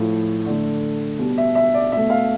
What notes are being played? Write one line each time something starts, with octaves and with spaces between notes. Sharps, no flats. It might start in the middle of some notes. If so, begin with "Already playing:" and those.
Already playing: A2 F3 A3
D3 A3
B2 G3
E5
E5
D5
B2 A3 E5
F5